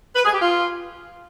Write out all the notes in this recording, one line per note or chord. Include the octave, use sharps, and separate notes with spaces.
B4
G#4
G4
F4